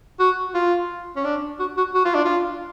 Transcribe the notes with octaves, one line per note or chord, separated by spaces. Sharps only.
F#4
F4
C#4
D4
F#4
F#4
F#4
F4
D4
F4